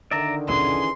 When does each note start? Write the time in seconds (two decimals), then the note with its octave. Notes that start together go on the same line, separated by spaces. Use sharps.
0.11 D3 D#3 D5 E5 A#5
0.48 D#1 B1 E3 C#4 G#4 C6